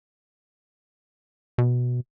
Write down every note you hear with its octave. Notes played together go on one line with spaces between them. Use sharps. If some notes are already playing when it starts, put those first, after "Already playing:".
B2